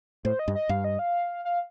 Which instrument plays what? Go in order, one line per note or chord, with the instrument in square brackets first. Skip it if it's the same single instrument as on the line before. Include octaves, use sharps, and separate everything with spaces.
[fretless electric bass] A2 [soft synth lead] C5
[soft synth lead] D#5
[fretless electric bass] G2
[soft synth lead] D#5
[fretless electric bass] G2 [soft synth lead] F5
[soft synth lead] D#5
F5
F5